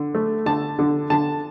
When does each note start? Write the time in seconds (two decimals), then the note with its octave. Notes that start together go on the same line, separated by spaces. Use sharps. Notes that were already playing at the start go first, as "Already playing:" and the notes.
Already playing: D3
0.15 A3
0.46 D3 A5
0.79 D3
1.10 D3 A5